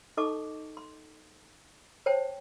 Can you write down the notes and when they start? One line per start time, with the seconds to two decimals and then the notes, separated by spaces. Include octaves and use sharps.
0.17 D#4 A4 D#5 A5 C#6 D6
0.77 C6
2.06 C5 C#5 G5 A5